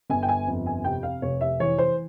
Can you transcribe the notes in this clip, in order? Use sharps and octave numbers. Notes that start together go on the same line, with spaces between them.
G1 G#5
G5
G#5
F2
G#5
C3 G5
F5
F1 C#5
E5
E3 C#5
C5